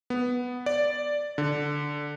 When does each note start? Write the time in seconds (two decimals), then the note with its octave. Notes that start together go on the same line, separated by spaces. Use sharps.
0.10 B3
0.66 D5
1.38 D3